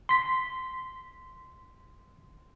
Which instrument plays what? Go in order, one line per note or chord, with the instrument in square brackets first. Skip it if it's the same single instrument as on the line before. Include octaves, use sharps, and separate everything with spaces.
[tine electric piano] C6 B6